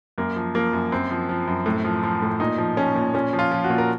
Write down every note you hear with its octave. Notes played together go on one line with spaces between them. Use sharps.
F#2 A#3
F3
F3 A#3
F#2
F#2 C4
F3
F3
F#2
A2
F3
F3
A2
A#2 D#4
F3
F3 C#4
A#2
A#2 C#4
F3
F4
F3
F#4
A#2
A#4